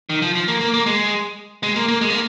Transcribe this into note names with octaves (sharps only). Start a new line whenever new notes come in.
D#3
F3
F3
A#3
A#3
A#3
G#3
G#3
A#3
A#3
G#3
A#3